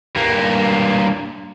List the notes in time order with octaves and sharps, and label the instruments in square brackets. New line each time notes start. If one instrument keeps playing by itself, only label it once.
[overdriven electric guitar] G2 A#3